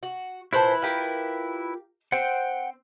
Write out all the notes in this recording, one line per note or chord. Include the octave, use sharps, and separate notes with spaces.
F#4
A#2 E4 B4 C5 A5 B5
F4 G4 A#4
C4 C5 F#5 G5